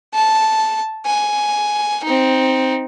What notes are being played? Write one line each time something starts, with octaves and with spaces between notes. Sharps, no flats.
A5
G#5
C4 D#4